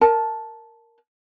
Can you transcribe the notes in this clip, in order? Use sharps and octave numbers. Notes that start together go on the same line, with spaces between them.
A#4 A5